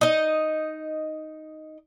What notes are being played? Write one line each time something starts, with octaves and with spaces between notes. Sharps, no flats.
D#4 D#5